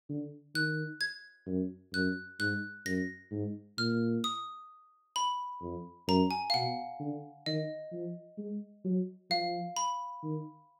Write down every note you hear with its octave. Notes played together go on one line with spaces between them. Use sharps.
D3
D#3 F#6
G#6
F#2
F#2 F#6
G#2 F#6
F#2 A#6
G#2
A#2 F6
D#6
B5
F2
F#2 A#5
G#5
F5
B2 F#5
D3
D#3 D#5
F3
G#3
F#3
F3 F5
B5
D#3